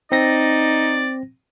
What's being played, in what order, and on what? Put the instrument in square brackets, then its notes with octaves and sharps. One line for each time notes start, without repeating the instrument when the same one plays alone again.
[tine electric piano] C4 A#6 [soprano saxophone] D#4 [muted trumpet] D5